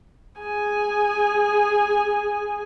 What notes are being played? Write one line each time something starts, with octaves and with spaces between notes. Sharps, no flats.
G#4 G#5